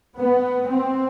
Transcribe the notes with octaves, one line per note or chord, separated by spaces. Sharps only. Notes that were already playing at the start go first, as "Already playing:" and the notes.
B3
C4